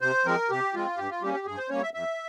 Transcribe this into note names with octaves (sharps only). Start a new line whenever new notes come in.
C3 C5
F3 G#3 C4 A#4
C3 G4
F3 G#3 C4 F4
G2 G4
F4
G3 A#3 C#4 G4
G4
G2 G#4
C5
G3 A#3 C#4 C#5
E5
F2 E5